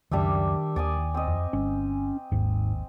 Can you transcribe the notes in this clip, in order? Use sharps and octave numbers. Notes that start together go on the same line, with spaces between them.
C#2 F#2 D#3 G3 D4 E5
D#2 D5 G#5 D#6
C4 D#5
F2
G1 C#4
G#1 D#2 G#2